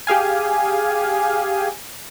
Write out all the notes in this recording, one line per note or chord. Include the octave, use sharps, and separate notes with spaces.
G4 G#4 F5 G#5